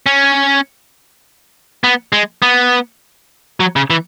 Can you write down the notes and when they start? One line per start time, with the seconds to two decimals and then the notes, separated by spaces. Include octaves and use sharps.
0.06 C#4
1.84 B3
2.13 G#3
2.42 B3
3.60 F#3
3.76 C#3
3.90 E3